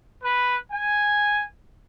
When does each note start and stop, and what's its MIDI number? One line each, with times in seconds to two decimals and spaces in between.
0.23 0.55 71
0.72 1.44 80